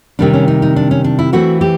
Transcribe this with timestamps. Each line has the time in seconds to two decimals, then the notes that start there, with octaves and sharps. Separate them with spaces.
0.19 C3 D#3 G3 D4
0.33 C#4
0.48 D#4
0.62 D#4
0.76 D4
0.91 C#4
1.04 D4
1.19 E4
1.33 E3 A3 C4 F#4
1.61 G4